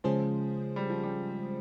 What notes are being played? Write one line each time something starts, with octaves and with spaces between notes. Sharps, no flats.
C#3 F3 G#3 C#4 G#4 C5
G3
F3
G3